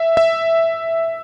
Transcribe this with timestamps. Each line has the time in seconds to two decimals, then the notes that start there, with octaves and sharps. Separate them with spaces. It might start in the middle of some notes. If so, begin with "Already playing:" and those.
Already playing: E5
0.17 E5